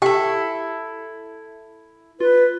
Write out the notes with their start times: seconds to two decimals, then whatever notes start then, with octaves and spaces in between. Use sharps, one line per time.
0.02 E4 G4 A4 G5
2.20 F4 B4